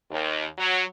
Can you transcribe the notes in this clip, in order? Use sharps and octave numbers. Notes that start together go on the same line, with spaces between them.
D#2
F#3